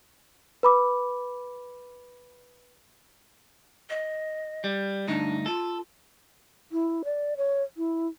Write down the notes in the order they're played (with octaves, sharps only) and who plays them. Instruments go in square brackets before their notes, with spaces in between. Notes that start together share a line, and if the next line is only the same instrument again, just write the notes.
[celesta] B4 B5 D6
[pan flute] D#5
[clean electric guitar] G3
[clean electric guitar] D2 G2 D#4 [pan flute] D4
[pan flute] F4 [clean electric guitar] A4
[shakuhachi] E4
D5
C#5
E4